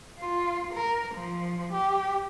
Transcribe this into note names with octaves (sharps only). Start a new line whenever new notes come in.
F4
A#4
F3
G4